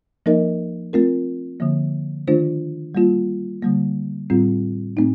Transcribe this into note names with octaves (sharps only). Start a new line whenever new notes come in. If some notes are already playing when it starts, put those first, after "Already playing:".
F3 A#3 D#4 A#4 D#5
A3 C4 F4 A#4
D3 F3 A#3
D#3 A3 D4 F4 C5
G3 A#3 F4
D3 G3 A#3
A2 G3 C4 F4
A2 A3 C4 D#4